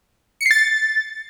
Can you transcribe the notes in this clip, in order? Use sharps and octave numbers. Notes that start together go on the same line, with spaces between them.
C#7
C7
A6